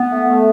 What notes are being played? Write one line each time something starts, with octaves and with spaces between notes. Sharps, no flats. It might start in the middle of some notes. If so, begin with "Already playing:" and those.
Already playing: B3
A3
A3